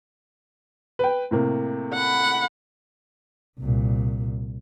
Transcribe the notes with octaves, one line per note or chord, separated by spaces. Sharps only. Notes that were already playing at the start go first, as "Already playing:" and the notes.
B4 G5
A2 C3 A#3
F#5 B5
C2 A#2